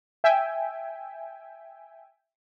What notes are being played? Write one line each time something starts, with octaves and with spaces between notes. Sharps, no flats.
E5 G5 G#5